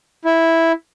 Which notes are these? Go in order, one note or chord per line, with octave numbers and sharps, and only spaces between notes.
E4